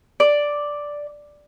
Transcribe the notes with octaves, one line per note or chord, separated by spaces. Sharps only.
D5